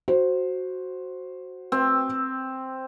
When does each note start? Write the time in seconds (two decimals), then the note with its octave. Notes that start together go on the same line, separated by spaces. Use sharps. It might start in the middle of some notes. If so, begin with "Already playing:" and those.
0.08 F#4 C5
1.72 C4